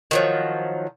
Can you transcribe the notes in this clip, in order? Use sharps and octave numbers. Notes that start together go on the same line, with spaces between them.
D#3 F3 F#3